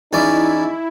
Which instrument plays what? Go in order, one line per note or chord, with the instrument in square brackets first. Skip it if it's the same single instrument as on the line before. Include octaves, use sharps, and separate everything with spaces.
[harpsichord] E2 C#4 D5 [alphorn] D#4 [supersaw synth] E4